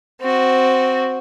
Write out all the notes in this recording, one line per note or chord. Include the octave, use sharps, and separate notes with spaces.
C4 F#4